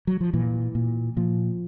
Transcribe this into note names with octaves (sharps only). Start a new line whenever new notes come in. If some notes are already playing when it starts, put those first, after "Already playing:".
F#3
F3
A#2 E3
A#2
A#2 F3